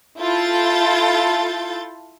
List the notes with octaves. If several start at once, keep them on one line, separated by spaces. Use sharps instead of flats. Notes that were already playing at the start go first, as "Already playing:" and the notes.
E4 F4 A4 G6 A6